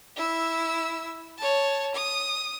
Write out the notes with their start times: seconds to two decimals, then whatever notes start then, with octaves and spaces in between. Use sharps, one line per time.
0.16 E4 E6
1.38 C#5 A5
1.95 D#6